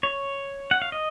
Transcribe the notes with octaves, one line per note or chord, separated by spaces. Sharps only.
C#5
F#5
F5
D#5